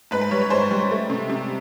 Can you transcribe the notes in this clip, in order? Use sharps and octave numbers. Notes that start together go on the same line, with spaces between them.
G#2 B4
B4
G3 C#5
C#5
G#2 C5
G3
A3
C3
C3